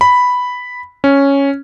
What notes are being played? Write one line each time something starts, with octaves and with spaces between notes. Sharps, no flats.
B5
C#4